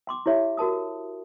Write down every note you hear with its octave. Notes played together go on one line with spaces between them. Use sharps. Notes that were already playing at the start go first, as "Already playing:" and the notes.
G5 C6 D6
E4 G4 C#5 E5
F#4 A#4 A5 D#6